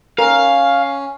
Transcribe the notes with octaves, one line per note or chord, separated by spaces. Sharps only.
C#4 A#4 F5